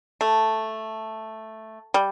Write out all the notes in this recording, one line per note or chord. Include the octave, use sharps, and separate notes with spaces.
A3
G3